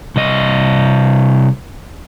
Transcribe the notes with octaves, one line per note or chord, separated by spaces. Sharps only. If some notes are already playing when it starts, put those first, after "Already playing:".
C2 D#5